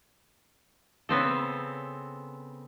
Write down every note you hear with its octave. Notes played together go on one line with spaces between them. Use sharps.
C#3 B3 C4 A4